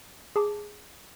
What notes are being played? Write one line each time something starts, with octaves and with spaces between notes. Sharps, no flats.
G#4 A5 D6